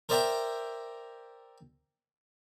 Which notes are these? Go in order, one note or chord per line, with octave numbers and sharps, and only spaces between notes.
A#4 C5 D5 E5 G5 A#5